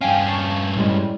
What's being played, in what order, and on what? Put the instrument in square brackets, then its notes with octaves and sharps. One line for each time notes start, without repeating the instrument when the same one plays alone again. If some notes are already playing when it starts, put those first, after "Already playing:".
[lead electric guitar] G2 C#4 [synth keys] F5 G5 G#5
[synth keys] F5 A5 C#6
A2 G3 G#3